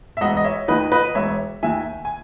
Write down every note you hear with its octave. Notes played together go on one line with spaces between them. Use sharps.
E5
E1 D#5 F#5
D#5
C#5 E5
D#2 D#3 B4 D#5
B4 D#5
E1 C#5 E5
D#2 D#3 E5 G#5
G#5